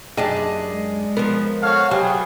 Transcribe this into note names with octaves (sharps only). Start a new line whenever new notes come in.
F#2 D4 G4 G#4 D#5 A5
G#3
F3 B3 A#4
F#4 A4 C#5 F5
F#3 B3 G4 G#4 C5